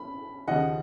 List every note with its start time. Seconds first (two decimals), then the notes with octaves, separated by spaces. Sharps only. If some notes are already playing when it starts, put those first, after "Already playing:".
Already playing: B5
0.48 D#2 C#3 F3 D#5 F#5